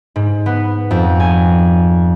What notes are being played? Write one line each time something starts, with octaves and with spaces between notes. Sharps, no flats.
G#2
B3
F2
G#5